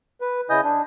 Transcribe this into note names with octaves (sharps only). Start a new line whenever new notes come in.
B4
C#3 E4 D#5 G#5 D#6 G6
D4